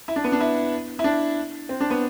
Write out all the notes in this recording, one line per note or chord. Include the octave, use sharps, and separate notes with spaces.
E4
D4
B3
D4
E4
E4
D4
C4
D4
B3